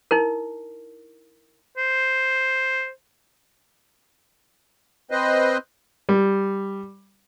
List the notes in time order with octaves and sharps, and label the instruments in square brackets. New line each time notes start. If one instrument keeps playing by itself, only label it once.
[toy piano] D#4 E4 A#4
[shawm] C5
[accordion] C4 B4 C5 D#5
[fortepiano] G3